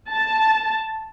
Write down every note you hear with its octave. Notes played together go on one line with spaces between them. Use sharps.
A5